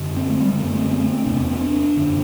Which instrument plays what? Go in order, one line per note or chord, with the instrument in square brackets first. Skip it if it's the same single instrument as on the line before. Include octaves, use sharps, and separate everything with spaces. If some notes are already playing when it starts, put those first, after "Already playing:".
Already playing: [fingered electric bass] F#2 D3
C4
A3
G3
F#2 D3 A3
B3
C4
B3
A3
C4
E2 C3 D4
C4
B3
C4
D4
F#2 D3